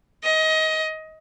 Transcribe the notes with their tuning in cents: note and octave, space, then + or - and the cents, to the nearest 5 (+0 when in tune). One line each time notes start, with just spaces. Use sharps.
D#5 +25